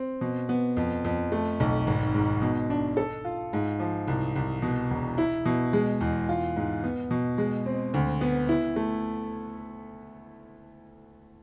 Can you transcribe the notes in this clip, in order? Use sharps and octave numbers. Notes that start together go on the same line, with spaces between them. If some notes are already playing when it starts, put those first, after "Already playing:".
Already playing: C4
B2
B3
F2
F2
A3
B1
G#1
G#2
B2
D4
A4
F4
G#2
F3
C2
C2
B2
E1
E4
B2
G#3
E2
F4
G#2
B3
B2
G#3
C4
D2
B3
E4
A3